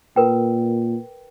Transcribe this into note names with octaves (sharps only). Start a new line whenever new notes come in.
A#2 A#4 B4 G5